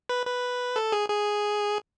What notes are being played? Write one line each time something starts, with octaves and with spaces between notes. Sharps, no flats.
B4
B4
A4
G#4
G#4